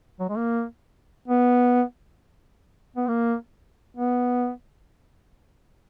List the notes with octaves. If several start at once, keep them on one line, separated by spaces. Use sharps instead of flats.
F#3
G#3
A#3
B3
B3
A#3
B3